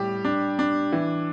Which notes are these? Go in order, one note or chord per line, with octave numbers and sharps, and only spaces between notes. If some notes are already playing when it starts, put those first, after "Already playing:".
Already playing: A2 G3 G4
D4
D4
E3